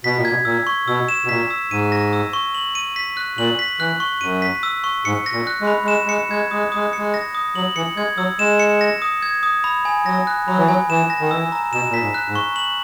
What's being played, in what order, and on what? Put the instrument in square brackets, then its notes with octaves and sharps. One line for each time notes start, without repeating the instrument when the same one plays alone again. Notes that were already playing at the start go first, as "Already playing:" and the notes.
[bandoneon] B2 [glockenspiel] B6
[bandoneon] A#2
[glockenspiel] G#6
[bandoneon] B2
[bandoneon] A#2 [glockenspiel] E6
[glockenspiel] C#6
[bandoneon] B2 [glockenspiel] E6
[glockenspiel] E7
[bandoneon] B2
[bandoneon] A#2 [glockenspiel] B6
[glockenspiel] E6
[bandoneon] G#2 [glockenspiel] D#7
[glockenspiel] A#6
E6
C#6
F#7
D#7
B6
F#6
[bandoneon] A#2 [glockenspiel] F#7
[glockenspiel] B6
[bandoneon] E3 [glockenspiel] F#6
[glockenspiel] C#6
[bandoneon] F#2 [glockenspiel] D#7
[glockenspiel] B6
E6
C#6
[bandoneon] G#2 [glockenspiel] C#7
[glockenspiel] A#6
[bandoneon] A#2
[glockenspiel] F#6
[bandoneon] G#3
[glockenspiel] B5
[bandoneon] G#3 [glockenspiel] E7
[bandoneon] G#3 [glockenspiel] C#7
[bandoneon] G#3 [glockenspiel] G#6
[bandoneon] G#3 [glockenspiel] D#6
[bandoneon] G#3 [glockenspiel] D#6
[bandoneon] G#3 [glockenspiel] C#7
[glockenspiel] A#6
D#6
[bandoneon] F#3 [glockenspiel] F#7
[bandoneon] E3 [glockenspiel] C#7
[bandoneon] G#3 [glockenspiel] G#6
[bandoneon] F#3 [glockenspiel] E6
[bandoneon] G#3 [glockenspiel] E7
[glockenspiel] C#7
A#6
D#6
G#6
D#6
B5
G#5
[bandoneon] F#3 [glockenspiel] A#6
[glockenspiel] F#6
[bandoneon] F#3 [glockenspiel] B5
[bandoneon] E3
[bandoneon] F#3 [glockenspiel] G#5
[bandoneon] E3 [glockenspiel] E7
[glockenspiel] A#6
[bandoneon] D#3
[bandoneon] E3 [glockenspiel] E6
[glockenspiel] A#5
[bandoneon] B2 [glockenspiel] E7
[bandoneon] A#2 [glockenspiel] B6
[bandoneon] G#2
[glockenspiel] F#6
[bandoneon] G#2
[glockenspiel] C#6
F#7